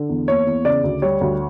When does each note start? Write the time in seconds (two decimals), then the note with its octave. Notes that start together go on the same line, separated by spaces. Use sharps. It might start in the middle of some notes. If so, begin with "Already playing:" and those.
Already playing: D3
0.09 E2
0.28 A#3 C#5
0.46 E2
0.65 C#3 D5
0.84 D2
1.02 G3 C#5
1.21 D2